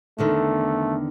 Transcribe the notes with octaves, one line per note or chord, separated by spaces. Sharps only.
E2 D3 D#3 A3